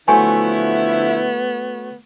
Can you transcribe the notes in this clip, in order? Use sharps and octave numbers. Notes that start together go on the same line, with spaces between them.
D3 F3 F#3 A3 B3 E4 C5 G#5